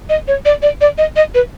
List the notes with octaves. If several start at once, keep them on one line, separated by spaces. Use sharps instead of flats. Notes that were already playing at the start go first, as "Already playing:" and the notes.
D#5
C#5
D5
D5
D5
D#5
D#5
B4